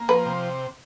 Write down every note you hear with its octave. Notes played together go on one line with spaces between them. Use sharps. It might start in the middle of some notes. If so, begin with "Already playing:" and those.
Already playing: A#3
F3 B4
C3